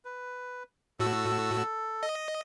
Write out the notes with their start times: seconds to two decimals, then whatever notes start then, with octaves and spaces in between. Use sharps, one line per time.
0.05 B4
1.00 A2 F#4 A4 E6
2.03 D#5